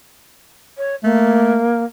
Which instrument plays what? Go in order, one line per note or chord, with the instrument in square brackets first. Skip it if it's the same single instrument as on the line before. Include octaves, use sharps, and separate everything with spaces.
[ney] C#5
[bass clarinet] A3 [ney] A#3